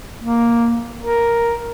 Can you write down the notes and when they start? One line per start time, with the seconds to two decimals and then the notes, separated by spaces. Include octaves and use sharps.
0.20 A#3
1.01 A#4